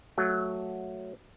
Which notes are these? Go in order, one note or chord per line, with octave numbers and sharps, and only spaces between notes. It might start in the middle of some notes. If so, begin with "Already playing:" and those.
F#3 A3